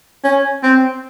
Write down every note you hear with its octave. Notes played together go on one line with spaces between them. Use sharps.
C#4
C4